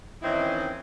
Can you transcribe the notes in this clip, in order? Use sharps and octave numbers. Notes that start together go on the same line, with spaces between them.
D#3 E3 C4 C#4 D#4 E4